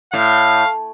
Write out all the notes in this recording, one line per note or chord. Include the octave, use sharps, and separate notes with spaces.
A2 F5